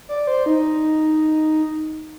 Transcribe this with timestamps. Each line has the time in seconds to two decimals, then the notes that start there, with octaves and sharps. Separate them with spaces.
0.09 D5
0.27 C5
0.46 D#4